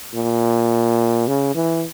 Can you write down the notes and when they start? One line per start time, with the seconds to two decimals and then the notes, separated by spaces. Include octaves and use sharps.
0.14 A#2
1.28 C#3
1.55 E3